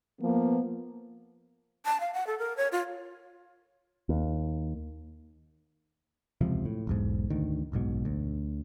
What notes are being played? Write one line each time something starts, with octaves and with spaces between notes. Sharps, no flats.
F3 A#3 B3
A5
F5
F#5
A4
A#4
C#5
F4
D#2
E1 C#2 C3 F3
A2
E1 B1 G#2
D2 D#3
F#1 B1 G#2 B2
D2